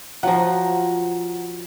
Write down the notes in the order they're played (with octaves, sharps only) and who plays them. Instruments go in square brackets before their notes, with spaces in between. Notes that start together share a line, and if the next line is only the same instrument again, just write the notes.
[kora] F3 F#3 [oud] F4 [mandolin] F#5 A#5